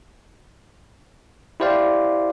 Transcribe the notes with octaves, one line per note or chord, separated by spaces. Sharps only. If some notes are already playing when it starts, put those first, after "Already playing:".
E4 G4 C5 D5 F5